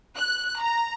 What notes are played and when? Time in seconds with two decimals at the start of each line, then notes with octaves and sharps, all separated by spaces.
0.16 F#6
0.60 A#5